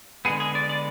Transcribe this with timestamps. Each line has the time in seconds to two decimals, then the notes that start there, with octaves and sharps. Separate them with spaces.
0.25 D3 G#3 B3 G#4
0.40 G#4
0.55 D5
0.69 D5